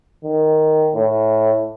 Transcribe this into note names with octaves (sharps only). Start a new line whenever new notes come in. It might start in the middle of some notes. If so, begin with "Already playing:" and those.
D#3
A2